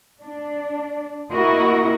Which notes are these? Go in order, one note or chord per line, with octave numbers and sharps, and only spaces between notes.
D4
A#3 E4 F#4 A#4 D#5